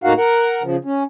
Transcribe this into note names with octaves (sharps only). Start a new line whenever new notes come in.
A2 A#3 D#4 F#4 F5 F#5
A#4 F#5
C#3 F3
C#4